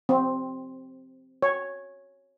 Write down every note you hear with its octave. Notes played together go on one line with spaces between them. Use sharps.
C4
C#5